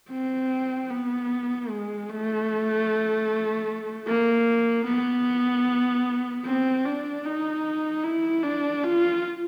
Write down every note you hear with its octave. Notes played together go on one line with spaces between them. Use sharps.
C4
B3
G#3
A3
A#3
B3
C4
D4
D#4
E4
D4
F4